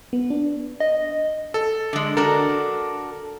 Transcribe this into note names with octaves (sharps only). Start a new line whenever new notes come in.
B3
D4
D#5
A4
D3 G#3
D4 F#4 A4 A#4